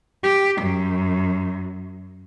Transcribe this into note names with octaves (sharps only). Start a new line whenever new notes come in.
G4
F#2